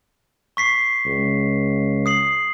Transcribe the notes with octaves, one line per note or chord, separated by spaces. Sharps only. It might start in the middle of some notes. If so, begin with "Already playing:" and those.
C#6 B6 C7
C#2
D#6 C7 F#7